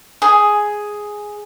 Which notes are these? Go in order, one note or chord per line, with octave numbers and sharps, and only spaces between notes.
G#4